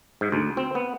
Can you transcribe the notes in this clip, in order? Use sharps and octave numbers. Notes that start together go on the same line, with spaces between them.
G#2
D2
C4
B3